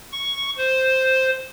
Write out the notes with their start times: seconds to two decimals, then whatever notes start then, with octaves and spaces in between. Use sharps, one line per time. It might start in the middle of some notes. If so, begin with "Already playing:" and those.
0.12 C#6
0.57 C5